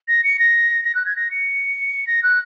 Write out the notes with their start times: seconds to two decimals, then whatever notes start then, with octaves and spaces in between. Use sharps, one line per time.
0.08 A#6
0.24 C#7
0.39 A#6
0.84 A#6
0.95 F#6
1.06 G#6
1.16 A#6
1.31 C#7
2.07 A#6
2.23 F#6